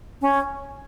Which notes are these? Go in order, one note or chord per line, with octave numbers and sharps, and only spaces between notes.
C#4